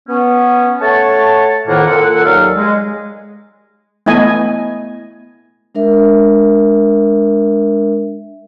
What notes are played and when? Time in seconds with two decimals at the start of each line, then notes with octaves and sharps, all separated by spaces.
0.09 B3 C#4
0.80 A3 C#5 F#5 A5
1.68 F2 A2 D#3 A#3 F#5
1.86 A#2 A4 F#5
2.24 D#2 F#3 D5 E5 F5
2.55 G#3
4.06 A3 B3 E4 D#5 G#5
5.75 G#3 D4 A#4 E5